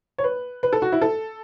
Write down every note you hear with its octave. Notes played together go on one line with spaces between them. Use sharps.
C#5
B4
B4
A4
F#4
E4
A4